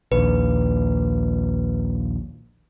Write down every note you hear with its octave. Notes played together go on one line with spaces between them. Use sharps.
A#1 D#2 B4